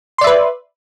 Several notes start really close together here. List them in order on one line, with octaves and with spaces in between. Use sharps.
C6 D5 E5 B4